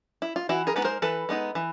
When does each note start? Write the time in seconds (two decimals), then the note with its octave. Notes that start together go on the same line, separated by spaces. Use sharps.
0.22 E4
0.36 F4
0.49 E3 E4 F#4
0.67 G#4 A#4
0.76 G#3 B3 D#4 B4
0.84 A#4 C5
1.02 E3 A4 B4
1.29 G#3 B3 D#4
1.55 E3